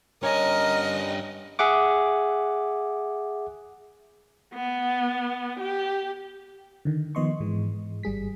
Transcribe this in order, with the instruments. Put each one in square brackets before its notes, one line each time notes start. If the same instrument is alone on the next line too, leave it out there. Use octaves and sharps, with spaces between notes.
[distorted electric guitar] G2 G#5 [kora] C#4 C#5 [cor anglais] A#4 [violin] D#5
[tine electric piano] G#4 E5 F#5 D6
[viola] B3
G4
[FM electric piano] D3 D#3
D#3 F3 B3 D#5 C6 C#6
G#2 E3 G#3
G1 G3 G#4 B6